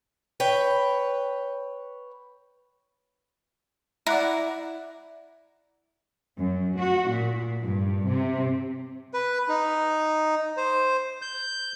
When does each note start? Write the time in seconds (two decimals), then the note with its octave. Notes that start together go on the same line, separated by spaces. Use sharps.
0.40 B4 C#5 G5
4.07 E4 D5 F#5 A#5
6.38 F#2
6.78 F#4
7.10 A#2
7.62 G2
8.08 C3
9.14 B4
9.48 D#4
10.57 C5
11.22 G6